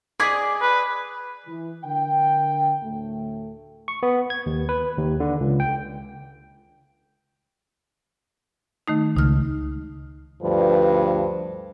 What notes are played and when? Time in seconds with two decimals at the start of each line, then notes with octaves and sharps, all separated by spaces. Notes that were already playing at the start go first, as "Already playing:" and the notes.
0.20 G#4 D5 D#5 D6 G#6 B6
0.61 B4
1.47 E3
1.84 D3 A#4 G5
2.83 D2 A2 A3
3.88 C#6
4.03 B3
4.30 G#6
4.46 D#2
4.69 B4
4.98 D#2
5.20 D3
5.41 C#2
5.60 G5
8.88 D#3 A3 D#4
9.17 C#2 D#4 F6
10.42 D2 G2 F3 B4